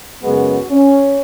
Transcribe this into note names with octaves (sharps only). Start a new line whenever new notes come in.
F#2 C#3 G#3 B3 F#4
C#4